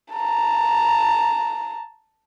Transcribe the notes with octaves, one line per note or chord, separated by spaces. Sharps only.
A5 A#5